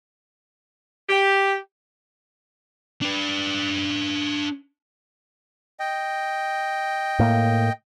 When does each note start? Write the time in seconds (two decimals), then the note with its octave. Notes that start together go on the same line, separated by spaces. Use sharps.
1.09 G4
3.02 D4 B4
5.80 D#5 G5
7.19 A2 A#3